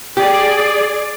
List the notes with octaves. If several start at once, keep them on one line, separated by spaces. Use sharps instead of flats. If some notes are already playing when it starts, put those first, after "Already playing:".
G4 G#4 D5